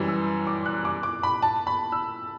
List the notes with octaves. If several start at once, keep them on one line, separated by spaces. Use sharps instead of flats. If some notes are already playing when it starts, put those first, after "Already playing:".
Already playing: F#2 E3 G3
E6
D6
F#6
D6
D6
B5
A5
B5
E6